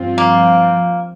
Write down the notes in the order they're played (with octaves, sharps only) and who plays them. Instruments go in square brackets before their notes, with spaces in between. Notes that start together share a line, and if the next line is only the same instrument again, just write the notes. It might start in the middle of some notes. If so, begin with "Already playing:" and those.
Already playing: [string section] G2 F3 C4 F4
[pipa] A#3